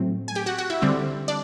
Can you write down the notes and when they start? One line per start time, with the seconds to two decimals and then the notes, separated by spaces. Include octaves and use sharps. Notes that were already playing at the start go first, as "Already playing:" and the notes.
Already playing: A2 F#3 A3 C4
0.28 G#5
0.35 G4 G5
0.46 F#4 F#5
0.58 F#4 F#5
0.70 E4 E5
0.82 D3 G3 C4
1.28 D4 D5